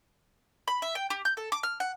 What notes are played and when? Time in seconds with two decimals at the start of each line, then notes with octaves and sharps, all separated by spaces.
0.68 B5
0.82 E5
0.95 G5
1.10 G4
1.25 G6
1.37 A4
1.52 D6
1.63 F6
1.80 F#5